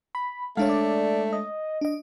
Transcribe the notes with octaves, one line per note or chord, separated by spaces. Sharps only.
B5
G#3 A3 D4 C#5 F5
D5
D#5
D4 D#5